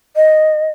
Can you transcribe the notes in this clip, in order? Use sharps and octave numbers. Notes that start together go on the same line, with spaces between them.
D#5